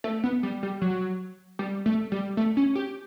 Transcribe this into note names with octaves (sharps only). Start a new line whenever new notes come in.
A3
B3
G3
G3
F#3
G3
A3
G3
A3
C#4
G4